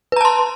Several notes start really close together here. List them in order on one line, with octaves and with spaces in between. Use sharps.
B4 A#5 A5 C6